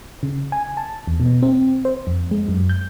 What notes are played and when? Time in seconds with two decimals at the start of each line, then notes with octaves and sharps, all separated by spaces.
0.23 C#3
0.52 G#5
0.77 A5
1.07 E2
1.20 B2
1.42 C4
1.85 C5
2.07 F2
2.31 G#3
2.48 F#2
2.69 G6